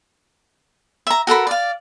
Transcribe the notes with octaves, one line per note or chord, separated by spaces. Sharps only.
E5 A#5
F#4 A4 A#4 B5
D5 F5